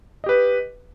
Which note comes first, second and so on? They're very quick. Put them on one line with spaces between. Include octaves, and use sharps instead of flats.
D#5 G4 B4